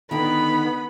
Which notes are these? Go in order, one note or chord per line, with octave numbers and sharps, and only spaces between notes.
D3 D#3 B3 B5